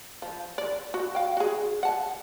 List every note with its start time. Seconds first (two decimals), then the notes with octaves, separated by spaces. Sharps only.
0.22 F3
0.58 D5
0.94 F#4
1.15 F5 G5
1.37 F#4 G#4
1.83 F#5 A5